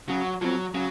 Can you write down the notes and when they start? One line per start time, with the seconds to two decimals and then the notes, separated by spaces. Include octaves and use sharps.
0.09 C#3 F#3
0.41 F3 F#3 C4
0.75 C#3 F#3